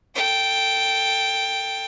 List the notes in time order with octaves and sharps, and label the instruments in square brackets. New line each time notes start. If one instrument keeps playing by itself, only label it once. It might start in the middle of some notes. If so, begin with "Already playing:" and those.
[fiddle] A4 G5